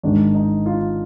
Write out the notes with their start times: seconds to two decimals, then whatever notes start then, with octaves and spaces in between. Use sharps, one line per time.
0.03 G#1 G#2 D#3 D4
0.35 D#4
0.66 F4